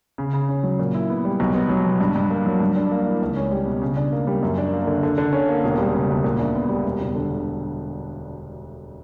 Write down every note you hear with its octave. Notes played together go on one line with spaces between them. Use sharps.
C#3
C#3
C#4
F#3
A#2
E4
B3
G3
B1
B3
F#3
B2
G2
G2
A#3
F#3
G2
D4
A#3
E3
C#2
C#4
G3
B2
C#3
D4
A#3
G3
F#2
D4
A#3
D3
D3
D3
C#4
A#3
E1
G3
C#3
D2
A#2
D4
B3
G3
E1
E1
D3